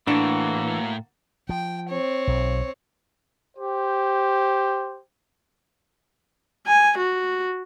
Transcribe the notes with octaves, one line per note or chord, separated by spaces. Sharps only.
A2 E3 A#3 D4 F#4
F3 G5
C4 C#5
B1
G4 C5
G#5
F#4